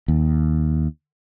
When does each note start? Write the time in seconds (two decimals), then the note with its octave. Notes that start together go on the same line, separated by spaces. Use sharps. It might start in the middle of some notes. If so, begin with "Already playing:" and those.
0.08 D#2